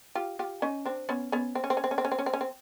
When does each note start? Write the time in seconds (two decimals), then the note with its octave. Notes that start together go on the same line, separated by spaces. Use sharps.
0.15 F4 G4
0.39 F4 G4
0.62 C#4 D#4
0.85 C4 D4
1.09 B3 C#4
1.32 B3 C#4
1.55 C4
1.64 C#4
1.70 C4
1.77 C#4
1.84 C4
1.91 C#4
1.98 C4
2.05 C#4
2.12 C4
2.19 C#4
2.26 C4
2.33 C#4
2.41 C4